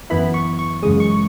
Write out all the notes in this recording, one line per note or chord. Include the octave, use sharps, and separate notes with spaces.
F#2 E3 B3 E4 B5
C#6
C#6
F#2 C#3 E3 G#3 D#6
C#6